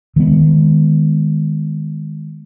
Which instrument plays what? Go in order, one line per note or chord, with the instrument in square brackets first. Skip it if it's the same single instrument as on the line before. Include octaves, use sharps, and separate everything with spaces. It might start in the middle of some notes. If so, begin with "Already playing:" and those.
[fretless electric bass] D#3 G#3 A#3 B3